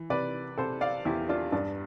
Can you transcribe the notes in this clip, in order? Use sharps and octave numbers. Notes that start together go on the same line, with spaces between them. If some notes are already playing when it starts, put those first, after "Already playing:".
Already playing: E3
C3 B4 D5
C3 A4 C5
D5 F5
E2 E4 G4
D4 F4
G2 D4